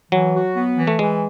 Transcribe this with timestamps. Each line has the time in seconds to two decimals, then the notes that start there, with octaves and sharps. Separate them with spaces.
0.12 E3 F#3
0.34 F#4
0.56 B3
0.77 E3
0.87 A3
0.99 E3 G#3